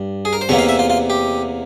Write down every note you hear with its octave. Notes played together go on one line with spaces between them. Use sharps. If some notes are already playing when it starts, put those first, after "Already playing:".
Already playing: G2 G3
G#4
A#4
C5
E2 C3 E3 A#3 C#5
F5
E5
F4
F4
G4